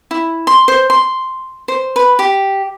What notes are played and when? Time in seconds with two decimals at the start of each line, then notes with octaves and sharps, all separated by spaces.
0.11 E4
0.47 C6
0.68 C5
0.90 C6
1.68 C5
1.96 B4
2.19 G4